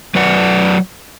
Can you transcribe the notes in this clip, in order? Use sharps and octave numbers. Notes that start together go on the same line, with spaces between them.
F#3 B4 D5 F#5